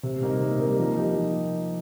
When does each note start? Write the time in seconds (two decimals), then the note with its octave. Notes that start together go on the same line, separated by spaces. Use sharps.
0.03 C3
0.22 G3 A#3 D#4 A#4
0.40 C3
0.59 G3 A#3 D#4 A#4
0.79 F3
0.97 D#4 G4 A#4
1.15 F3